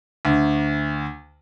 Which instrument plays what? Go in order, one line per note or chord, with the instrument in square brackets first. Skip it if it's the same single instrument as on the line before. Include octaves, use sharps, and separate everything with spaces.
[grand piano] D2